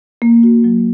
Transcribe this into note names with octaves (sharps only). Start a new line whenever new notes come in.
A#3
F#4
F#3